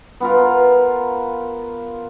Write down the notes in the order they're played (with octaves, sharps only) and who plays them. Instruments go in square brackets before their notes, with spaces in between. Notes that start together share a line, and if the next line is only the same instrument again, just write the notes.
[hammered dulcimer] B3 F4 A#4